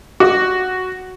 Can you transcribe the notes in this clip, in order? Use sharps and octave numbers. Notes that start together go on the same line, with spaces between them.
F#4